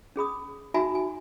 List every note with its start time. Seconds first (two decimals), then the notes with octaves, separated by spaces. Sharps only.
0.16 C#4 G#4 B5 D#6
0.74 D#4 F#4 E5 G#5 A#5 B5
0.95 G#5